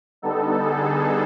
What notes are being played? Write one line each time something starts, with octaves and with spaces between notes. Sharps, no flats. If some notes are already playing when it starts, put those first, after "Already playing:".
D3 G3 B3 D#4 A4
G#4